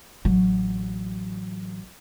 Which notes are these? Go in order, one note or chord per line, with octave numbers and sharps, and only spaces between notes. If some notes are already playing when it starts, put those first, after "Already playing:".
A1 F#3